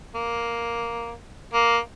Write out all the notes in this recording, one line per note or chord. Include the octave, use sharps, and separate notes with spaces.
A#3
A#3